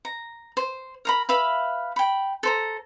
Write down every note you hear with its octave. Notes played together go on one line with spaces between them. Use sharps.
A#5
C5
A#4 A#5 B5
B4 E5 F5 B5
G5 B5
A4 C5 A#5